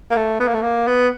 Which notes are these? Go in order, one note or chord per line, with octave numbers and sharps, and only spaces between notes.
A#3
A3
B3
A#3
A3
A#3
B3